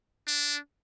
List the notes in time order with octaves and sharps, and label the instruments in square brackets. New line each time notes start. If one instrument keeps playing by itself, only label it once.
[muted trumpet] D4